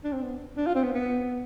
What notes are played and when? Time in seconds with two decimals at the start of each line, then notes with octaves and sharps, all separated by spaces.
0.04 D4
0.13 C4
0.22 B3
0.57 D4
0.67 F4
0.75 C4
0.83 B3
0.93 B3